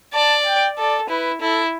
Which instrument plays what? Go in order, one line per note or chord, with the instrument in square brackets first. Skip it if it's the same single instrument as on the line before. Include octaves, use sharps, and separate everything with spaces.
[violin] D5 [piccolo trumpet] A5
[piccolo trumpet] G5
[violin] A4 [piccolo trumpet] D5
[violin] E4 [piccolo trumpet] B4
[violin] E4 [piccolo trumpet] A4